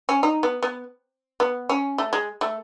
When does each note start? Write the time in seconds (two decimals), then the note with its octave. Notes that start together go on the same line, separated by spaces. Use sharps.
0.09 C#4
0.23 D#4
0.43 B3
0.63 B3
1.40 B3
1.69 C#4
1.98 A3
2.13 G#3
2.41 A3